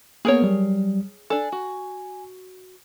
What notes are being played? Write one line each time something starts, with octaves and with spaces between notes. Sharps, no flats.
A#3 B3 G#4 A#4 C#5
F#3 G3
D4 A4 G#5
F#4